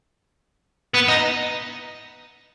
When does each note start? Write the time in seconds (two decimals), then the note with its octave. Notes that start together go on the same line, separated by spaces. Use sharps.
0.94 B3
1.09 D#4